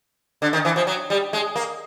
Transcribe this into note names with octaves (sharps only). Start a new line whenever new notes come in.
D3
D#3
E3
F3
F#3
G3
G#3
A#3